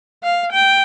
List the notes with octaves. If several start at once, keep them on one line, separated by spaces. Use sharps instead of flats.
F5
G5